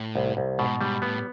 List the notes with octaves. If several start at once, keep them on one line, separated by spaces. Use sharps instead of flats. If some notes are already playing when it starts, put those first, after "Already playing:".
Already playing: A2
C2
C2
G#2 B2
G#2 G3
A2 B3